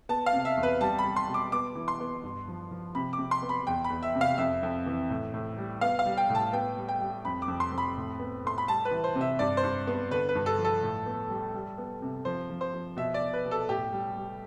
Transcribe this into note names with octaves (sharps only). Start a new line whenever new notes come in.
B3 A5
F5
C3
E5
E2
B4
G3 A5
B5
G3
C6
B2
D6
B3 D6
E3
C6
B3
G2
F3
F3
C3 B5
D6
C3
C6
B3
B5
E2 G5
B5
E2
E5
C3
F5
F2 E5
F2
E3
A2
A2
G3
B3 F5
F5
G3
G5
A2
A5
B3 G5
G3
G5
G3
F2 B5
D6
F2
C6
F2
B5
A2
B3
A2 C6
B5
G3 A5
B4
E3
C5
C3
E5
G2 D5
C5
G2
B3
D3 B4
B4
G2
A4
F3
A4
A2
B3
G3
G3
B3
C3
F3 C5
F3
C5
F3
B2 E5
D5
B2
B4
B2
A4
A2 G4
G3
G3